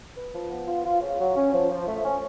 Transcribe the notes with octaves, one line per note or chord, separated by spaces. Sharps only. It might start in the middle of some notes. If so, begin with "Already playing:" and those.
B4
F3
B3
F4
F4
C#3
F#3
C#4
F3
F3
A3
C#4